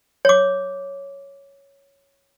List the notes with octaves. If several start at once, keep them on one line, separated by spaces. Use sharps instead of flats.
C#5 D6